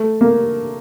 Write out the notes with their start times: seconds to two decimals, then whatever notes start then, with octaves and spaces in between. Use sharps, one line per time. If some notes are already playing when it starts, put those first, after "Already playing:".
Already playing: A3
0.21 A#3